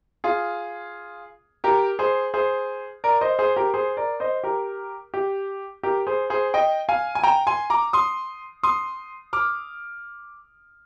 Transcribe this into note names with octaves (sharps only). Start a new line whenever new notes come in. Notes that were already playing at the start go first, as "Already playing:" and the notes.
F4 G#4
G4 A#4
G#4 C5
G#4 C5
A#4 D5
C5 D#5
G#4 C5
G4 A#4
G#4 C5
A#4 D5
C5 D#5
G4 A#4
G4
G4 A#4
G#4 C5
G#4 C5
D#5 G5
F5 G#5
G#5
G5 A#5
G#5 C6
A#5 D6
C6 D#6
C6 D#6
D6 F6